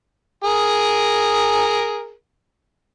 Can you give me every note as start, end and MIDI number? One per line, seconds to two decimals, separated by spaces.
0.44 2.13 68
0.44 2.13 70